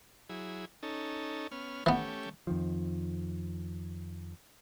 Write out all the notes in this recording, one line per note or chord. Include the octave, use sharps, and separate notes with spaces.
F#3 E4 G#4
C#4 D#4 A4
B3 C#4 F6
E3 A3 B3 C#4 G4
F2 D#3 F3